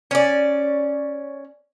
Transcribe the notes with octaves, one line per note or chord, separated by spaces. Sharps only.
C#4 D5